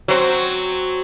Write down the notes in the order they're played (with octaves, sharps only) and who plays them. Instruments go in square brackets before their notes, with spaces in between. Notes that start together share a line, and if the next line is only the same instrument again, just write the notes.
[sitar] F#3 C4